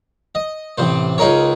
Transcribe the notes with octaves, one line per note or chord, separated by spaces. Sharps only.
D#5
A1 C3 C5
C#2 D#4 G#4 A#4 C#5